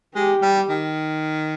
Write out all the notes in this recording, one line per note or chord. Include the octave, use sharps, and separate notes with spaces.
G#3 G4
G3
D#3